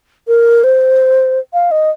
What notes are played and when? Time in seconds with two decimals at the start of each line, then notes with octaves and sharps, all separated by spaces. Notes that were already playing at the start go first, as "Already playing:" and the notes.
0.28 A#4
0.64 C5
1.53 F5
1.71 D#5